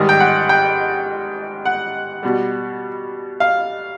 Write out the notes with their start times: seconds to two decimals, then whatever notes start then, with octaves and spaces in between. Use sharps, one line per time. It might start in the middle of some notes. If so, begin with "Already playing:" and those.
Already playing: G#2 D#3 G3
0.09 G5
0.20 F#5
0.49 G5
1.65 F#5
2.23 B2 G3
3.40 F5